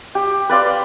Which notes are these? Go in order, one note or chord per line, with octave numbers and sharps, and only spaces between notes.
G4
B4 D5 F5 C6